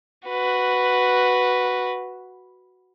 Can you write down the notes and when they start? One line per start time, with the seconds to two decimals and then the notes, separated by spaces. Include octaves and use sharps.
0.28 F#4 B4